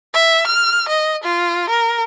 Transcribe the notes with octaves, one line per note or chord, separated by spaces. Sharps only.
E5
F6
D#5
F4
A#4